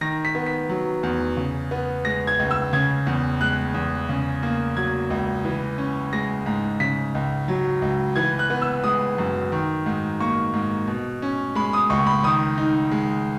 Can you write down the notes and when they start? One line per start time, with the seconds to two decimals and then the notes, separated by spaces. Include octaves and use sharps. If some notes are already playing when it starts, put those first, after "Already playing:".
0.01 D#3 A#6
0.25 B6
0.35 B3
0.46 B6
0.69 F#3
1.03 E2
1.37 C#3
1.71 B3
2.05 G#3 A#6
2.27 G#6
2.39 C#2
2.51 E6
2.73 C#3 G#6
3.07 E2
3.41 G#3 F#6
3.74 E2
4.09 C#3
4.43 A#3
4.76 F#3 G#6
5.10 C#2
5.45 E3
5.78 C#4
6.13 G#3 A#6
6.46 G#2
6.80 C#3 B6
7.15 C#2
7.48 F#3
7.82 C#2
8.16 E3 G#6
8.39 F#6
8.50 B3
8.62 E6
8.84 G#3 D#6
9.18 F#2
9.52 D#3
9.86 G#2
10.20 A#3 C#6
10.54 G#2
10.87 B2
11.22 C#4
11.55 G#3 B5
11.73 D#6
11.90 C#2 C#6
12.06 B5
12.24 D#3 D#6
12.58 D#4
12.91 G#3